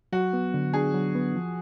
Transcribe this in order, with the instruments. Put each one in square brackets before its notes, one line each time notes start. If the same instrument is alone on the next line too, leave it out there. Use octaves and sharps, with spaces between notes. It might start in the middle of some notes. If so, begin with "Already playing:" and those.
[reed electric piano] F#3 [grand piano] F#4
[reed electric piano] B3
D3
[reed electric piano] D4 [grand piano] G#4
[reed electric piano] F#3
B3
F3